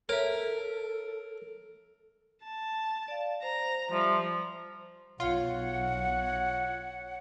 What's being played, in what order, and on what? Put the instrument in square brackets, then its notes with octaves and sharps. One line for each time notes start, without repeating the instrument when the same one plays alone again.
[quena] A4 [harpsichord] A#4 [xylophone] C#5 E5
[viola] A5
[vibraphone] D5 F5
[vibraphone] C5 [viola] A#5
[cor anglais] F3 [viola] G3 [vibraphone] D5 E5 C6
[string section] B1 [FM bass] F4 [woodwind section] C#5 F#5